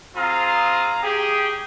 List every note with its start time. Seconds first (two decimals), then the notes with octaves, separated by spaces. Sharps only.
0.16 C4 F4 G#4 F5 A#5
1.03 G4 G#4